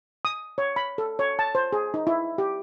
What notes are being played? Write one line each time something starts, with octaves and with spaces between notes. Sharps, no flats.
D#6
C#5
B5
A4
C#5
A5
C5
G#4
D#4
E4
G4